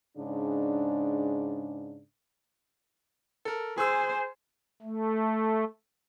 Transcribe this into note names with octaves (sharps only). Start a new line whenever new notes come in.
G#2 C#3 D4
A4 A#4
G#4 C5 G#5 C6 E6
A3